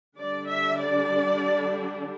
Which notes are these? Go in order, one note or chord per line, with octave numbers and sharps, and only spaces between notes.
D3 G3 D4 D5
E5
D5